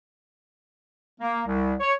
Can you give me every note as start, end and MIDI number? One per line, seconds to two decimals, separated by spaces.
1.20 1.42 58
1.46 1.74 36
1.80 1.93 73